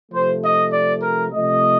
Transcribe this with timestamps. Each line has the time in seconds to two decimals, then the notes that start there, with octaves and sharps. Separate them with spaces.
0.11 C3 F3 A3 C5
0.42 D#5
0.72 D5
1.02 A#4
1.32 C3 F3 A3 D#5